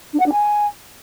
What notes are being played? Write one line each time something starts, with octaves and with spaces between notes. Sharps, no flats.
D4
F#5
D4
G#5